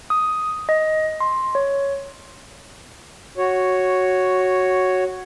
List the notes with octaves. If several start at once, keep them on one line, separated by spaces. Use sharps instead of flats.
D#6
D#5
C6
C#5
F#4 C#5